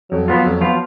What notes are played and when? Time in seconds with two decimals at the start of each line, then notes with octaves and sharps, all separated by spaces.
0.12 F2 F#3
0.28 F3 B3 F4
0.45 F2
0.61 F3 B3 F4